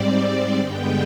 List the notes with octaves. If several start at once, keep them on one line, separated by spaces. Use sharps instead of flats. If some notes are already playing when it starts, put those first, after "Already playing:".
Already playing: G#2 G3 C4 D5
G2 D3 G#3 B3 G5